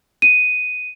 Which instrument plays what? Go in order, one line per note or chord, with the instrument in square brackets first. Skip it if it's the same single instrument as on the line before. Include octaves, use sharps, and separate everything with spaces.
[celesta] D#7